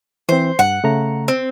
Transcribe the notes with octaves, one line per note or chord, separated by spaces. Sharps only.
E3 C4 C5
G2 F#5
C#3 A3 A#5
C4